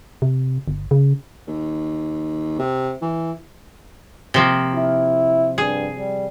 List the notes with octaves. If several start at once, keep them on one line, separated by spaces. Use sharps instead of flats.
C3
G1
C#3
D#2
C3
E3
C3 F3 A#3
E4
G2 G#4
G3